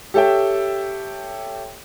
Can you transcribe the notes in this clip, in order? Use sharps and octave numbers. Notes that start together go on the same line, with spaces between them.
G4 A4 C#5 E5 G5